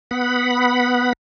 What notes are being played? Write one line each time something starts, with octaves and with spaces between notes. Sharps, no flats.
B3 F#5 B5